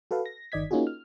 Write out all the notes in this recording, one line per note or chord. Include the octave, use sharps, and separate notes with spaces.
F#4 A4 B4 F5
A#6
G1 D#3 D5 D#5 G#6 B6
A#3 C#4 D#4 F4 F#4 G#4
F6